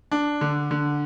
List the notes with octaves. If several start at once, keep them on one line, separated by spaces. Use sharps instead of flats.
D4
D3
D3